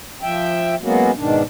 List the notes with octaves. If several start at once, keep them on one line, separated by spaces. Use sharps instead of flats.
F3 E5 G5
F#3 G#3 A#3 B3 C#4 F#4
G#2 B2 D#3 D4